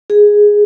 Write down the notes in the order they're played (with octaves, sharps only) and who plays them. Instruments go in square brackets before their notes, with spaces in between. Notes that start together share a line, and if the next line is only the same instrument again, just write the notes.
[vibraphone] G#4